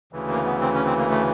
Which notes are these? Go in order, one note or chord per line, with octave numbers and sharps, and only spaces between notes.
D2 C#3 E3
A#3
B3
C4
C#4
C4
A#3
A3